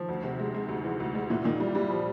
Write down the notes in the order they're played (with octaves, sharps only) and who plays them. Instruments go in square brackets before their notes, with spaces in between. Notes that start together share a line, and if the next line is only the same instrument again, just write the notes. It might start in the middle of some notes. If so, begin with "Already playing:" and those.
Already playing: [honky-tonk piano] D#3 [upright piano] F3
[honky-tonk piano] D2
C3
G#3
G#3
D2
E3
D2
G#3
[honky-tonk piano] A#2 [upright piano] E3
[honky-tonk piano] A#2 [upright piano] D#3
[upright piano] E3 [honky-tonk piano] G3
[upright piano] E3 [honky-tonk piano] G3
[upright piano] F3